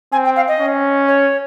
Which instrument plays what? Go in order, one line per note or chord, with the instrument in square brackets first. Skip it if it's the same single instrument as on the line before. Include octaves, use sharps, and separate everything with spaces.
[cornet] C4 [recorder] G#5
[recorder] G5
F5
D#5
[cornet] C#4
[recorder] C#5